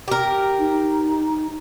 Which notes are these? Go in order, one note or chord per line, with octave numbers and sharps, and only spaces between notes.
G4 A#4
D#4